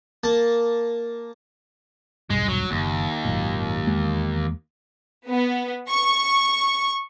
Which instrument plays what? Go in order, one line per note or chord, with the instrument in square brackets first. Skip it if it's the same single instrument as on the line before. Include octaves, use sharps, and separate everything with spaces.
[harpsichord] A#3 A5
[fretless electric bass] D#1 B1 G2 [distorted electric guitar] G#3
[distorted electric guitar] F#3
[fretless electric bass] F#1 [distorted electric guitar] D#2
[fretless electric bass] G#1 F#2 A#2
E2 G#3 A#3
[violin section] B3
C#6